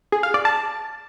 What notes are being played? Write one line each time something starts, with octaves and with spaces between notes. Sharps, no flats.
G#4
F5
D5
A5